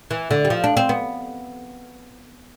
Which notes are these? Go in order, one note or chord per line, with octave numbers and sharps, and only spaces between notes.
E3
D3
G3
F3
D4
C4
B3